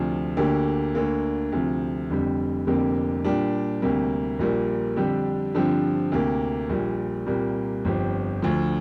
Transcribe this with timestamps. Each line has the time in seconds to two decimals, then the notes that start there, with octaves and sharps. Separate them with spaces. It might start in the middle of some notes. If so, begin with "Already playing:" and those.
Already playing: D2 C3 F3 D4
0.37 D2 D3 A#3 G4
0.95 D2 D3 A#3
1.52 D2 C3 F3
2.10 F1 F2 D3 G3
2.67 F1 F2 D3 A#3 G4
3.25 A#2 G3 D4 G4
3.82 D2 C3 G3 A#3
4.39 A#1 A#2 G3 A#3
4.96 F2 D3 G3 D4 G4
5.54 G2 D3 F3 C4 G4
6.12 D2 C3 A#3 G4
6.69 A#1 A#2 G3
7.27 C2 A#2 G3 A#3
7.85 G1 F2 F3 C4 G4
8.42 D2 D3 F3